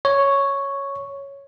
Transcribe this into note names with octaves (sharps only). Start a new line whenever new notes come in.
C#5